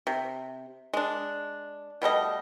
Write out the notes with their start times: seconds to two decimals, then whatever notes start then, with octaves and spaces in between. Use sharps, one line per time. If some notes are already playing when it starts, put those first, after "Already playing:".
0.07 C3
0.94 G#3 D4
2.02 B2 G3 A3 D#5